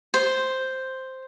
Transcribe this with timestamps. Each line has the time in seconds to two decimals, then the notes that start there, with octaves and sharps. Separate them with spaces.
0.14 C5